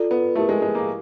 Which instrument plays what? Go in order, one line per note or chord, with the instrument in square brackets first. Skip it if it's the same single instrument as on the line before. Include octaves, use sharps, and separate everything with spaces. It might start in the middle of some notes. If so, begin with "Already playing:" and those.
Already playing: [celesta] F4 A4 D5
[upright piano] B3
[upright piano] A3 [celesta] E4 G4 A#4
[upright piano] G#3
G#3
A#3